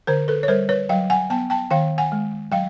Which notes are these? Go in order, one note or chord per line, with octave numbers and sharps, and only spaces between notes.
D3 A#4 C5
A4 B4
C#5
G3 A#4 C5
B4 C#5
F#3 F5 G5
F#5 G#5
B3 G5 A5
G5 A5
D#3 F5 G5
F#5 G#5
G#3
F#3 F5 G5